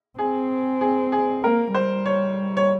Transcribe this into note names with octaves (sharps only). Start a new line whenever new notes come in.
C4 G#4
G#4
G#4
A#3 A#4
G3 C5
C#5
C#5